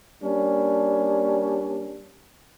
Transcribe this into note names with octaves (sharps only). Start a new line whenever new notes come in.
G3 A#3 C#4 D4